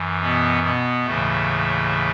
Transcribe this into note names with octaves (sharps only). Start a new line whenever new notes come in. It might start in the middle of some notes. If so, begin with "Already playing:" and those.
Already playing: F#2 E3
B2 B3
B2 B3
D#2 A2 C#3 E3 A3